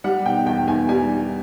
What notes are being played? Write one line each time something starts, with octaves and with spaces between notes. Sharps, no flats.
G3 F#5
B2 G5
E2 G5
E2 G#5
G3 G#5